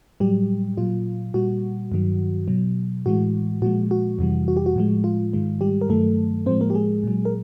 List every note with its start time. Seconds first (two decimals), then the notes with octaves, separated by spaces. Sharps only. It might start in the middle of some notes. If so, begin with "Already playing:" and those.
0.20 A2 F#3 G3 G4
0.77 A#2 F#3 F4
1.34 A#2 G3 F#4
1.92 G2 D#3 F#3
2.48 B2 F#3
3.06 A2 E3 G#3 F#4
3.62 A#2 F3 G#3 F#4
3.91 F#4
4.19 F2 C3 E3 G3
4.48 F#4
4.57 G4
4.66 F#4
4.76 A2 F3 G#3
5.04 F4
5.33 G#2 D#3 G#3
5.61 G3 G4
5.81 A#4
5.89 G2 D#3 F#3 A3 A4
6.46 A2 F3 G#3 C4 C5
6.61 A#3 A#4
6.70 G4
6.75 G#3 G#4
7.04 A#2 F#3
7.25 A#4